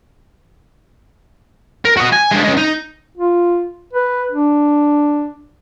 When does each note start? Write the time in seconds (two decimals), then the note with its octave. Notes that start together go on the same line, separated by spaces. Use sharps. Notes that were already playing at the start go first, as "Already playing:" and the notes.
1.85 A#4
1.97 F#4 D#5
2.12 G#5
2.31 G#3 D4
2.44 G#3 C#4
2.57 D#4
3.18 F4
3.93 B4
4.32 D4